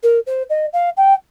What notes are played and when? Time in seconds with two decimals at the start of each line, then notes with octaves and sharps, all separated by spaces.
0.03 A#4
0.26 C5
0.49 D#5
0.73 F5
0.97 G5